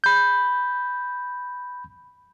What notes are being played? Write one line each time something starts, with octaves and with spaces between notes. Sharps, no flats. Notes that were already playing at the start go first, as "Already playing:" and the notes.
B5 G6